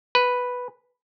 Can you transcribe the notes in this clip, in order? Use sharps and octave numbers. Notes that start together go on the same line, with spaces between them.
B4